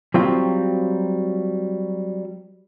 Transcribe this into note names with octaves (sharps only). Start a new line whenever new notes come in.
F#3 G3 C4 F4